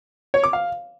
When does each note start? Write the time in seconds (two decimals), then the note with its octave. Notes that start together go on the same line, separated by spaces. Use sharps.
0.34 C#5
0.44 D6
0.53 F5